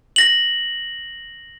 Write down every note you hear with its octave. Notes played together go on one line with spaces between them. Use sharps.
A#6 F#7